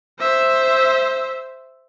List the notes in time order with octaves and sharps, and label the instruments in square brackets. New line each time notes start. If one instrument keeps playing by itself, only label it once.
[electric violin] C5 E5